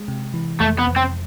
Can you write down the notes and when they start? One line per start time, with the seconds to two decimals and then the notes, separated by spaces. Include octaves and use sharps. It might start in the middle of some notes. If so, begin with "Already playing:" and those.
Already playing: G#3
0.08 C3
0.34 E3
0.60 F2 A3
0.79 B3
0.88 F2
0.96 C4